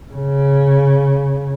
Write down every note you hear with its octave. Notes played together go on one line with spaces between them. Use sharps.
C#3